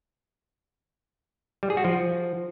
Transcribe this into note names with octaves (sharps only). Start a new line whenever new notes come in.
G3
G#4
F#4
F3